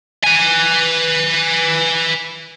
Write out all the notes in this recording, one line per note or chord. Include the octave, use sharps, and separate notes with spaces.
B4 G#5